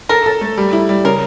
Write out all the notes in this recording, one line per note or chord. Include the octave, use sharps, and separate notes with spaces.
A4 A#4
A4
A3
G3
E4
G3
C#3 A#4